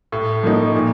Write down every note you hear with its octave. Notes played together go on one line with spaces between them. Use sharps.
A2
F3 A#3 D#4
A#2